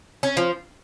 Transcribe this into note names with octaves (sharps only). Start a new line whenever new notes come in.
C#4
F3